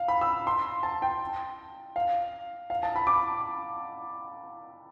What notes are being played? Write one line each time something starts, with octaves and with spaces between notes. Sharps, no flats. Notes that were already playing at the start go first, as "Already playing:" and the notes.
Already playing: F5
B5
E6
C6
A5
G5
F5
F5
A5
B5
D6